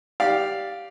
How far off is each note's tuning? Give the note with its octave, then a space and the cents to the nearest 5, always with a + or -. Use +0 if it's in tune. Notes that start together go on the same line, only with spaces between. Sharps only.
G4 +0 D5 +0 F5 +0